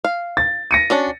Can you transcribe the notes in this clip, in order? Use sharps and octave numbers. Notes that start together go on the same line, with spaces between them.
F5
A6
A#6 C#7 D#7
C#4 D4 F#4